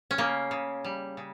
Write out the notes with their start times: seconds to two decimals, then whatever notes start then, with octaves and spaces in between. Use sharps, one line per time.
0.11 C#4
0.18 C#3 A#3
0.51 C#3
0.84 G3
1.17 C#3